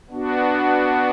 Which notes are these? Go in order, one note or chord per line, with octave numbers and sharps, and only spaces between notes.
B3 D4 F#4